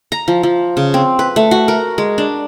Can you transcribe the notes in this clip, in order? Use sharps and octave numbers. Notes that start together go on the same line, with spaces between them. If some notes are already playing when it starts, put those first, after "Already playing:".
A#5
F3
F3
C#3
C4
B4
A3
F#4
A#4
G#3
D4